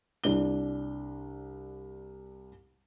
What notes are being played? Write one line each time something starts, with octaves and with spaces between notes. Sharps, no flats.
C2 D4 G7